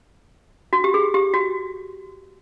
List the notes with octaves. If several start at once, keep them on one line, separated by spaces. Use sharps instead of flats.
F#4
G4
G#4
G4
F#4